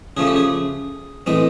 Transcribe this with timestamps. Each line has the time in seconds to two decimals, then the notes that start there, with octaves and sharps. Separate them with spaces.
0.17 C#3 F3 A3 C#4 G#4
0.27 G4
0.36 G#4
1.26 A2 E3 G#3 C4